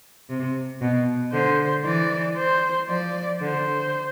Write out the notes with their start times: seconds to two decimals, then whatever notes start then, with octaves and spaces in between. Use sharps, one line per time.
0.30 C3
0.82 B2
1.33 D3 C5
1.85 E3 D5
2.36 C5
2.88 F3 D5
3.41 D3 C5